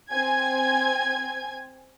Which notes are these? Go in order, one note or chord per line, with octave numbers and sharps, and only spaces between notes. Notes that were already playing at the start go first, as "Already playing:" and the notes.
C4 G#5 G#6